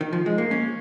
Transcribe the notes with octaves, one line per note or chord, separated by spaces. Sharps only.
D#3
F3
G#3
A#3
C#4